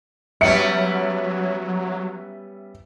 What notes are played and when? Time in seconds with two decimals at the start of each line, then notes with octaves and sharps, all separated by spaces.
0.41 F#3 G3 B3 C#4 E5 C#7